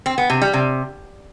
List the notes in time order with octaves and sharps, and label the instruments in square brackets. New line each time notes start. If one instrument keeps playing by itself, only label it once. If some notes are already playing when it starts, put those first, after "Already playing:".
[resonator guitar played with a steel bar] C4
B3
C3
G3
C3